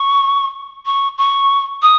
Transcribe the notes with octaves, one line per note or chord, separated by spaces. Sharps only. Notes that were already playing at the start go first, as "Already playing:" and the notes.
Already playing: C#6
C#6
C#6
D#6